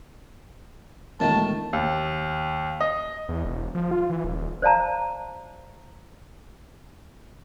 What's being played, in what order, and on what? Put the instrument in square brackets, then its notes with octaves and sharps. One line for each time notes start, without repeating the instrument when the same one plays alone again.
[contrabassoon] E1 [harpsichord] A2 D#3 A3 [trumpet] A5
[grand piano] D#2
D#5
[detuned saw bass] E2
E1
F3
F4
E3
D#1
[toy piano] C5 D5 F5 A5 A#5